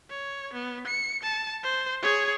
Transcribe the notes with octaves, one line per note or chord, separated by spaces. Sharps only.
C#5
B3
C#7
A5
C5
G#4 C#5